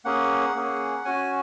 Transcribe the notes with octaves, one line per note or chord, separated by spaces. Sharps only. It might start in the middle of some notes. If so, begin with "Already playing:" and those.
A#3 C#4 G#4 F#5
A#3 C#4 G#4
C#4 F#4 G#5